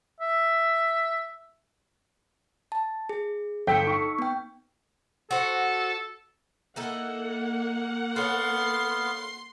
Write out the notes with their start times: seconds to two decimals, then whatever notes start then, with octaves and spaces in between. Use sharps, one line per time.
0.20 E5
2.72 A5
3.09 G#4
3.67 G1 A4 G5 E6 B6 C#7
3.87 D#4 C#6
4.19 B3 G5
5.31 F#4 A4 C5
6.76 A#3 D#4 E4 A4 F#5
8.16 B3 A4 C#5 F5 C6